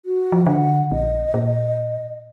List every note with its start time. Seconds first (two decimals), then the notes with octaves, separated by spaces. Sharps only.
0.06 F#4
0.32 F3
0.47 D3 F#5
0.92 A#1 D#5
1.34 A#2